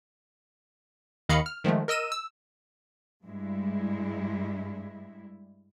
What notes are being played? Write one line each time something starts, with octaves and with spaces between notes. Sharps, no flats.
D#2 D#3 D#5 F5 B5 C#7
F6
D#3 F3 G#3 A3
A#4 D#5 E6 D#7 E7
E6
G2 G3 G#3 E4